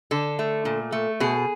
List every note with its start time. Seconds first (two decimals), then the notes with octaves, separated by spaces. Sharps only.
0.11 D3 A4
0.39 A3
0.65 A#2
0.92 A3
1.20 B2 G#4